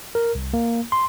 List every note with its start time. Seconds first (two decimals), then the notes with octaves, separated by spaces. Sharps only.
0.15 A#4
0.35 C2
0.53 A#3
0.92 C6